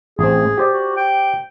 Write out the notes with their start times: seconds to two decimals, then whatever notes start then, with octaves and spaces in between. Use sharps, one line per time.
0.19 A1 C4 G#4
0.58 G4 C5 D5
0.73 F#4
0.97 G5